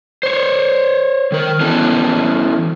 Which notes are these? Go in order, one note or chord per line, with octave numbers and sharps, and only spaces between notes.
C5 C#5
D#3 A#4
E3 B3 C#4 F#4 A4